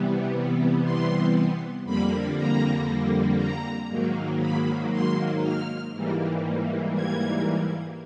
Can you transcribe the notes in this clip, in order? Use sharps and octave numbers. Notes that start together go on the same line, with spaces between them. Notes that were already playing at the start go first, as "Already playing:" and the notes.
Already playing: C3 E3 G3 B3
C6
F2 D3 G3 A#3 B5
A#5
A#5
G#2 D#3 F#3 A#3
B5
C6
F6
G#2 E3 G3 A#3
G#6